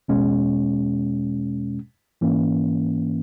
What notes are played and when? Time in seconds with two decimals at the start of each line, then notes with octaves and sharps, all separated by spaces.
0.08 E2 B2 G#3 C#4
2.21 G#2 E3 A#3 C#4